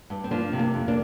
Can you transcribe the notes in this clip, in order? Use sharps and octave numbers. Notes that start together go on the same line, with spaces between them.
G2
C4
F3 A#3 D4
C3
A#3 D4
F2
A#3 D4